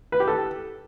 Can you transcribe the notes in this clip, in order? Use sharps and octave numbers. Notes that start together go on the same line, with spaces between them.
B4
G4
A4